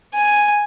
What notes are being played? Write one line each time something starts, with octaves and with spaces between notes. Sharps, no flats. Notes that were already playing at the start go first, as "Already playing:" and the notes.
G#5